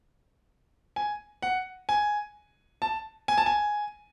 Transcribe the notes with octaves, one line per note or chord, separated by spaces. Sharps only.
G#5
F#5
G#5
A5
G#5
A5
G#5